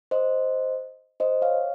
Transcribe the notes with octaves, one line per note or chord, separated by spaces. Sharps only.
C5 D#5
C5 D#5
C#5 F5